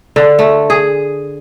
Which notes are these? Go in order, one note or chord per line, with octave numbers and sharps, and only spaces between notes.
D3
A3
G#4